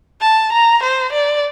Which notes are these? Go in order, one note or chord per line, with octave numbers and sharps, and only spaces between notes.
A5
A#5
C5
D5